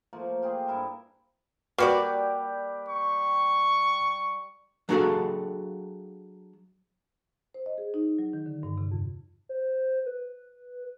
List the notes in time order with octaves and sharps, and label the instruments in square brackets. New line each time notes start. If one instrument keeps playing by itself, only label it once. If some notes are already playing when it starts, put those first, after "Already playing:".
[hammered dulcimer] F3 A3 A#3
F4 G4 G#4 C5
G2 E4 A#4 A5
[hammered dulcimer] G3 G4 [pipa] A#3 F#4 D5 [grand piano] B4
[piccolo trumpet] C#6
[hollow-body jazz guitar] F#3 D4 F#4 G#4 A4 F5
[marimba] C5
D#5
G#4
D#4
F#3
D#3
D3
G2
C3
F2
[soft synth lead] C5
B4